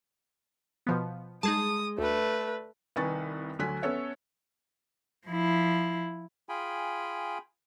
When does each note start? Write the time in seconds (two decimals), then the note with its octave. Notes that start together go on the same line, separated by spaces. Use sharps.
0.87 B2 F3 B3
1.43 G#3 D#4 G#4 A5 D#6
1.98 D2 A3 B4 D5
2.96 C2 D#3 B4 G#5 C#6 A6
3.59 D2 D3 F#3 G#5 F#6 B6
3.82 B3 C#4 A4 C#5 E5
5.27 F3 E4
6.49 F4 G#4 G5 G#5 B5